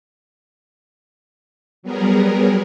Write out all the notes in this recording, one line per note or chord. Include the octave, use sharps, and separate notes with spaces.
F#3 G3 B3 G#4 A#4